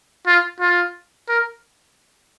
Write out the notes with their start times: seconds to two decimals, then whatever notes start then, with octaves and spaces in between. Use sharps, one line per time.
0.27 F4
0.60 F4
1.29 A#4